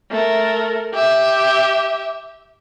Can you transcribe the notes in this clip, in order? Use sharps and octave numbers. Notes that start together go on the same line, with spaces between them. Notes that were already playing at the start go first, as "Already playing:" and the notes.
A3 A#4
G4 E5